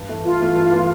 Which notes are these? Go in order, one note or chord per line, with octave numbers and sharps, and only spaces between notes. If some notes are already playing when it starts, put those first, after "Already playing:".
Already playing: G2
E3 A3
G2 F4
E3 A3
G2
E3 A3